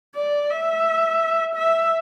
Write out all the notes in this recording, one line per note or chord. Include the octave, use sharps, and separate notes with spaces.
D5
E5
E5